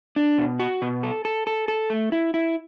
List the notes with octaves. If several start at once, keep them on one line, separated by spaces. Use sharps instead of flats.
D4
B2
F#4
B2
A4
A4
A4
A4
A3
E4
E4